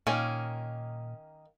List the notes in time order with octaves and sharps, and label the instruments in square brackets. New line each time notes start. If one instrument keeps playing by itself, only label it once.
[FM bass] A#2 [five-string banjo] D#3 A#3 C#4